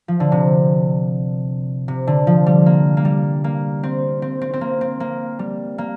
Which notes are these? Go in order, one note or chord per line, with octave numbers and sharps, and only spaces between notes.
F3
D3
C3
C3
D3
F3
G3
A#3
A#3
G3
A#3
C4
C4
C4
C4
A#3
C4
A#3
G3
A#3